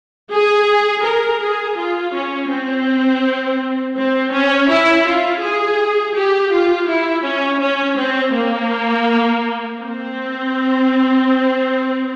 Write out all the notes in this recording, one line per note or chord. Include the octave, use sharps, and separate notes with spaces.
G#4
A#4
G#4
F4
C#4
C4
C4
C#4
E4
F4
G#4
G4
F4
E4
C#4
C#4
C4
A#3
C4